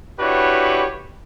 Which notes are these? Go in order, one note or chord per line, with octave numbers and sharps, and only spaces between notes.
D4 E4 F#4 G4 B4 C#5